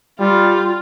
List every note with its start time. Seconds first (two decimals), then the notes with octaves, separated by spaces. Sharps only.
0.20 G3 F4